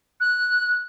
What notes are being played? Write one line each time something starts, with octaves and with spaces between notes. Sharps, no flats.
F#6